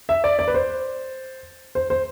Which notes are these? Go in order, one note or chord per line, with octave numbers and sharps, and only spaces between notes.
E5
D5
D5
B4
C5
C5
C5